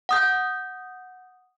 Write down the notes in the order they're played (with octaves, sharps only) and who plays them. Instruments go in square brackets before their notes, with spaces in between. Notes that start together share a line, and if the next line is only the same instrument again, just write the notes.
[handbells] F#5 D#6 G6